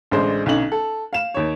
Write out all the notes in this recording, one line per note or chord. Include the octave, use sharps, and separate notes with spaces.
A1 D3 G#3 C5 D5
B1 D3 C#4 D#4 F#7
A4
F5 E7
D#2 C#5